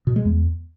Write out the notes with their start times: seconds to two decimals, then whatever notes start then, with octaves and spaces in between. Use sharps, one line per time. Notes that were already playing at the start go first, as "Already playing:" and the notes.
0.07 B2
0.16 G#3
0.25 E2